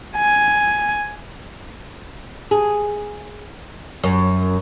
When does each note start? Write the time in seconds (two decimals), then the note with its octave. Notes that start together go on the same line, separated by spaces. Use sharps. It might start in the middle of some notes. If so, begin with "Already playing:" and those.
0.16 G#5
2.51 G#4
4.04 F#2